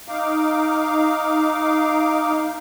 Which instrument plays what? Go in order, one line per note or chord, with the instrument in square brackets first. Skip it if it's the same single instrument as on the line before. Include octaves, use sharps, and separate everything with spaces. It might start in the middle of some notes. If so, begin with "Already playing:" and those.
[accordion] D#4 F5 D6